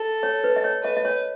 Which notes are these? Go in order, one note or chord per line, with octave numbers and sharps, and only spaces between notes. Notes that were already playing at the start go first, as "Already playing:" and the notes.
Already playing: A4
C#5
B4
D#5
C#5
B4 D#5
D#5
C#5